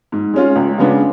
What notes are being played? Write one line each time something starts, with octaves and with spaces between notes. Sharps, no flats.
G#2
G#3 C#4 F4
C#2
C#3 G#3 B3 D4